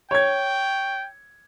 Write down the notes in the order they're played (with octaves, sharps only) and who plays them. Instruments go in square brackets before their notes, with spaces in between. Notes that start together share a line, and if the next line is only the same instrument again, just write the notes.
[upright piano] C#5 G#6 [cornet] G5